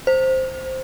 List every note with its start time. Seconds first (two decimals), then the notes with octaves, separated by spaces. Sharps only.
0.07 C5